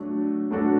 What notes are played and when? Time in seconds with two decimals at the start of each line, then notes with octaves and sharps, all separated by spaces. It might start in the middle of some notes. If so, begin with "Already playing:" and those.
Already playing: F#3 A3 D4 F#4 A4
0.51 F#3 A3 D4 F#4 A4